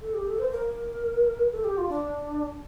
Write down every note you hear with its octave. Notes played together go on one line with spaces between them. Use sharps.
A4
G4
A4
C5
A#4
A4
G4
F4
D4